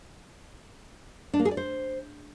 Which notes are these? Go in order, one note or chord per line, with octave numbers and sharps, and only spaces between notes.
D4
A#3
G#4
D5
C5